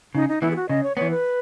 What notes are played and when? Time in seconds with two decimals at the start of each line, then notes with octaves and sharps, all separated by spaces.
0.15 C#3 D#4
0.29 D#4
0.42 E3 B3 E4
0.51 G#4
0.56 F#4
0.69 C#3 D#5
0.83 C#5
0.96 E3 B3 C#5
1.10 B4